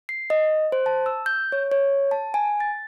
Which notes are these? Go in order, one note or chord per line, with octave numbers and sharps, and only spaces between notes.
C7
D#5
C5
A5
E6
G6
C#5
C#5
A5
G#5
A6